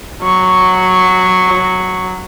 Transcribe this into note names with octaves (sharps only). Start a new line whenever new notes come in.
F#3 C#6